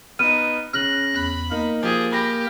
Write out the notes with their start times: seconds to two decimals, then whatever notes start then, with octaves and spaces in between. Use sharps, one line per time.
0.19 B3 D#4 F6 D#7
0.73 C#3 F6 F#6 A#6 F#7
1.15 E2 B5
1.51 A#3 D#4 A#4
1.83 F3 G4 G#4
2.12 G4 B5 A#6 B6